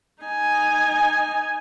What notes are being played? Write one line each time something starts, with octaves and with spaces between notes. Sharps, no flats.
D#4 G#5